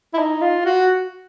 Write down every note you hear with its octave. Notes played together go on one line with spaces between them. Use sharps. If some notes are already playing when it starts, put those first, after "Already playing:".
E4
D#4
F4
F#4